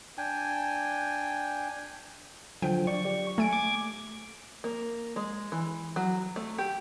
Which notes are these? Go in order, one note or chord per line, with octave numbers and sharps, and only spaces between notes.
D4 G5 G#5
D3 F3 F#3 G5
D5 C#6
G4
A3 G#5 D7
D6 G#6
A#3
G#3
E3
F#3
A3
G4